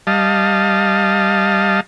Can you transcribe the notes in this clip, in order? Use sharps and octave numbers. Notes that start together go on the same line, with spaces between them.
G3 D#5 F5 A5